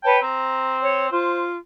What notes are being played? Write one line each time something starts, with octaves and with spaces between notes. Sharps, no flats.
B4 C#5 G5 A5
C4 A#5
C#5
F4 C5